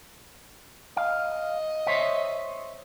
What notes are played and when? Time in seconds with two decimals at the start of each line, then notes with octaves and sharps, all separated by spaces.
0.97 D#5 F5
1.87 C5 C#5 E5